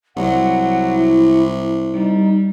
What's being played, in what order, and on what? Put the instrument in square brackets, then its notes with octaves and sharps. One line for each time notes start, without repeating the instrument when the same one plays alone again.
[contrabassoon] C2 [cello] F#3 [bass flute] F#5
[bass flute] E4
[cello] G3 [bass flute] D#4